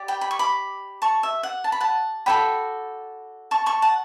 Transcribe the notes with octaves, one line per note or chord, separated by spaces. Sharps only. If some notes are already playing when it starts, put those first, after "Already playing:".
Already playing: G4 D5
G5 B5
B5
C#6
B5 D6
A5 C#6
E5
F#5
A5
B5
F#5 A5
F#4 A4 D5 G5 B5
A5 C#6
A5 C#6
F#5 A5